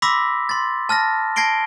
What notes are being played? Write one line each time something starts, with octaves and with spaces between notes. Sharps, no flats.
B5 C6 D6 E6 A#6 B6
C6 A6
A5 F6 A6 A#6
A5 G#6 A#6 C7 D7 G7